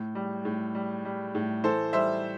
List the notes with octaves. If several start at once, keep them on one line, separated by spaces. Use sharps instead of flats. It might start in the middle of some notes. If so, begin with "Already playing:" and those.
Already playing: A2
G3
A2
G3
G3
A2
E3 A4 C5
G3 C5 E5